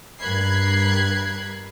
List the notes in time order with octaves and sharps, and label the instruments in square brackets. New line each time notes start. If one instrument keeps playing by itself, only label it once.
[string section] G2 A#4 B5 F#6 G#6 C7